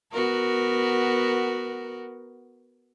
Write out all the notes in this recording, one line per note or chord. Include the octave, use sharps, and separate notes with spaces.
B3 F#4 A#4